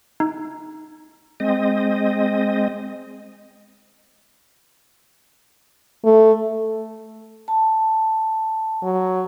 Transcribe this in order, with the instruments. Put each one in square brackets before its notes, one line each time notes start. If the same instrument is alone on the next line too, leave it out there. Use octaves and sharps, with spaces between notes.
[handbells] D#4
[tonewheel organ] G#3 C4 D#5
[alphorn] A3
[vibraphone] A5
[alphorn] F#3